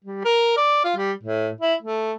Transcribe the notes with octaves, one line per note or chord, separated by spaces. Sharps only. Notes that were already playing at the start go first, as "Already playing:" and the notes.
G3
A#4
D5
F4
G3
A2
E4
A3